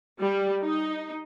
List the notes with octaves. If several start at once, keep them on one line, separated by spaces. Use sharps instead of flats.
G3
D#4